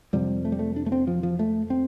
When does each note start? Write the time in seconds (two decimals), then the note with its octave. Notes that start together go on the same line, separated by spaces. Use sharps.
0.13 F2 C3 G3
0.45 A3
0.52 G3
0.59 A3
0.76 D4
0.86 A3
0.92 C4
1.07 F3
1.23 F3
1.39 A3
1.70 C4